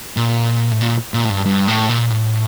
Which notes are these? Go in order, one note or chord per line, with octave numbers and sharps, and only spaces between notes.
A#2
A2
A#2
A#2
A2
G2
G2
A2
A#2
A2